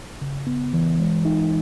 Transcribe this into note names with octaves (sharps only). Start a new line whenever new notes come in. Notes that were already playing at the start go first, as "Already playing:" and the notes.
C#3
B3
E3
G#3
D#4